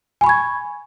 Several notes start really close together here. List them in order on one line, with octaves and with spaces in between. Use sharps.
G#5 B5 C#6 G#6